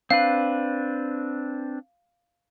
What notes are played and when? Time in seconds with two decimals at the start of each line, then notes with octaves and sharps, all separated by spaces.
0.10 C4 D4 B4 F5